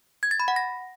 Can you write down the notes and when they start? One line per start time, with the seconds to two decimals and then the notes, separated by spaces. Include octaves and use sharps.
0.23 G#6
0.31 A6
0.40 B5
0.48 F#5
0.56 A#6